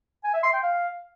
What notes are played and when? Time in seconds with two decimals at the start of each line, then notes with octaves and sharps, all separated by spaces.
0.24 G#5
0.34 E5
0.44 C6
0.53 G5
0.63 F5